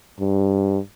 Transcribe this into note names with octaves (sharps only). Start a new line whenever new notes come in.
G2